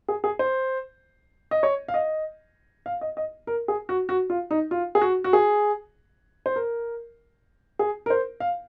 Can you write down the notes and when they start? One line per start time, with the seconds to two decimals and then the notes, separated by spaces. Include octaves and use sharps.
0.08 G#4
0.24 G#4
0.39 C5
1.51 D#5
1.63 C#5
1.88 F5
1.94 D#5
2.86 F5
3.01 D#5
3.17 D#5
3.47 A#4
3.68 G#4
3.89 F#4
4.09 F#4
4.30 F4
4.51 D#4
4.71 F4
4.95 G#4
5.01 F#4
5.24 F#4
5.33 G#4
6.46 C5
6.56 A#4
7.79 G#4
8.06 A#4
8.10 C5
8.40 F5